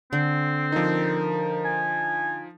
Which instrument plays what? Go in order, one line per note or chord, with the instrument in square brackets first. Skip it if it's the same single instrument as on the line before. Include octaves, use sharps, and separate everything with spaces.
[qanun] D3 [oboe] C4
[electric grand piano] F3 D#4 [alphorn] A#4
[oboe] G#5